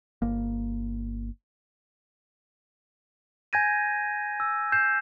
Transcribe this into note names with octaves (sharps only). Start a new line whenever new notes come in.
G1 A#3
G#5 G6 G#6 A#6 D#7
E6
G6 C7 E7